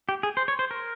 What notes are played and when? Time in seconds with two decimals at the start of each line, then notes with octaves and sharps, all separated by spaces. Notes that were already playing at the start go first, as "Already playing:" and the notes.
0.09 G4
0.23 G#4
0.37 C5
0.48 C#5
0.59 C5
0.71 A#4